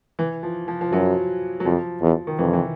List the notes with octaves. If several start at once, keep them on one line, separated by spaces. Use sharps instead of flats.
E3
F3
F3
F3
F#2 F#3
F#3
F2 F3
E2
D#3
F2 E3
E3